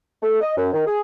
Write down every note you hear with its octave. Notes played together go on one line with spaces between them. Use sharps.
A3
D#5
F#2
D#3
G#4